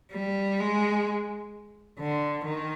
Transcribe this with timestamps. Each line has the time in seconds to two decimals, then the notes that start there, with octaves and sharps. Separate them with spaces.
0.12 G3
0.59 G#3
1.99 D3
2.45 D#3